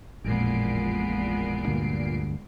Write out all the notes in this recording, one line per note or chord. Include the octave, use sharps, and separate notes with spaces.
A1 F2 A#2 G#3 B3 C7 D7
D2 G2 D3